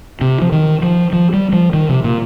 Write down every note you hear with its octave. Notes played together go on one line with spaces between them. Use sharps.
C3
F3
D#3
F3
F3
G3
F3
D#3
C3
A#2